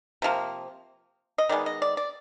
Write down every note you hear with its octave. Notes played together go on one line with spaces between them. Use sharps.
C3 F3 A#3
D#5
D#3 G#3 B3 D5
D#5
D5
D5